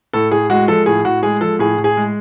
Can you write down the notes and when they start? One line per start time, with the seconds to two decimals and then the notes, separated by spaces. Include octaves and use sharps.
0.13 A2 A4
0.31 A2 G#4
0.50 G#3 F#4
0.68 F3 A4
0.86 A2 G#4
1.05 A2 F#4
1.23 G#3 G#4
1.41 F3 A4
1.59 A2 G#4
1.77 A2
1.84 G#4
1.97 G#3